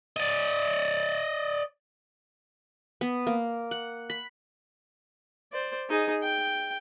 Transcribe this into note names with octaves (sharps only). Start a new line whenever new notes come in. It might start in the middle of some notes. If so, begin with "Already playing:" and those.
D5 D#5
B3
A#3
F#5
B5
C5 D5
D#4 G#4
G5